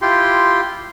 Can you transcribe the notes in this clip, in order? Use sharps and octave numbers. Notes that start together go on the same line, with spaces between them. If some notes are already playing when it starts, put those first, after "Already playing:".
E4 F4 G4 G5 C6